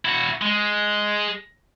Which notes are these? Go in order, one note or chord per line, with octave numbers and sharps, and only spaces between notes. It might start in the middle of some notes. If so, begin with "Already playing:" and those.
E4 F#4
G#3